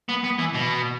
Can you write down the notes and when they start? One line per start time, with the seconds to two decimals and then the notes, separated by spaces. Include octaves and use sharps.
0.09 B3
0.24 B3
0.39 E3
0.54 B2